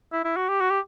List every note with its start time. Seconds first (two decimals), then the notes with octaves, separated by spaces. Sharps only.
0.12 E4
0.24 E4
0.36 F#4
0.48 G4
0.61 F#4
0.70 G4